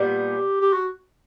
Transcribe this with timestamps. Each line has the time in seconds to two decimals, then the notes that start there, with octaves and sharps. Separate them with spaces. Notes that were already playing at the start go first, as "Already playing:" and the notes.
Already playing: A#2 G3 B3 G4
0.61 G4
0.73 F#4